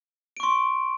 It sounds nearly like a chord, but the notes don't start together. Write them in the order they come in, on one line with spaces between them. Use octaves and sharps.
D7 C#6 C6